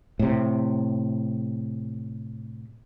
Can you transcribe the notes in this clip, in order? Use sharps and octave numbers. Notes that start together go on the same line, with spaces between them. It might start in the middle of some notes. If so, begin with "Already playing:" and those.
A2 C3